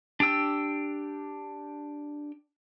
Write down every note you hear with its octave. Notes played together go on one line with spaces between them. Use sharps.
D4 G4 G5 E6